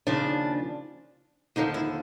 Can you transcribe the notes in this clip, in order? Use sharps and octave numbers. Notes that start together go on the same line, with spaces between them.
D#2 C#3 F3 D4
D#2 D3 F3 D#4
E4